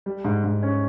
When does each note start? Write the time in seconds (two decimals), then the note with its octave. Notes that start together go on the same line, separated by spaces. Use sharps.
0.06 G3
0.25 G#2
0.44 G#2
0.63 C#4